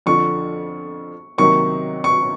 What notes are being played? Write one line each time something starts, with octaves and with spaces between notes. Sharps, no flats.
F2 D3 F3 C#6
C3 D#3 F#3 A#3 D#4 C#6
C#6